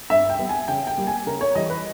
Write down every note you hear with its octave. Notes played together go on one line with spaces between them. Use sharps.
G2 E5
G5
G3 B3
G#5
C#3 G5
G5
G3 A#3
G#5
C#3 A#4
C#5
E3 G3 D#5
B4